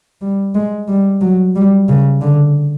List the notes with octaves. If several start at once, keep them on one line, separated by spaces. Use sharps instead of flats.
G3
G#3
G3
F#3
G3
C#3
D3